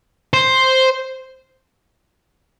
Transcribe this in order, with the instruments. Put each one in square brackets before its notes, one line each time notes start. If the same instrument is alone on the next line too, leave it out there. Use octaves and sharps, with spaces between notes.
[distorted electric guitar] C5